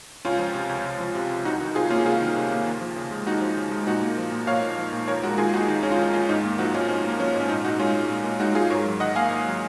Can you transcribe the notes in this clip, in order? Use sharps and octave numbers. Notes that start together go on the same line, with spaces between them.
C#2 C#4 F4
F3
C3
C#2
C#2
F3
C3
C#2
C2 D#4 F#4
D#3 D#4 F#4
C3 F4 G#4
A#3 C#4 F4
C2 F4 G#4
D#3
C3
A#3
D#2
F3
C#3
G#3
D#2 D#4 F#4
F3
C#3
G#3
A#2 D#4 F#4
A#3
F3
A#2
A#2 C#5 F5
A#3
F3
A#2
D#2 A#4 C#5
G#3 F#4 A#4
D#3 F4 G#4
D#2 D#4 F#4
D#2 D#4
G#3 C#4
F4
D#3 D#4
D#2 C#4 F4
G#2 D#4
A#3
F3 D#4 F#4
G#2 C#4 F4
G#2 C#4
A#3
F3 C#4
G#2
C#4
A#2 D#4
A#2 D#4 F#4
G#3 C#4 F4
G#3
A#2
A#2
G#3 D#4 F#4
G#3 F4 G#4
G#2 A#4 C#5
F#3
D#3 D#5 F#5
A#3 F5 G#5
G#2
F#3